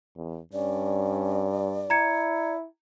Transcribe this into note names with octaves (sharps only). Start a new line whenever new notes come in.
E2
G2 C#4 D5
E4 A#5 G#6 C#7